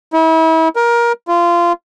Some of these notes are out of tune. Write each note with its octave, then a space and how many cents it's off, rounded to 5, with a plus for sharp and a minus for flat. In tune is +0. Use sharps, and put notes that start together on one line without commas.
E4 -35
A#4 +20
F4 -20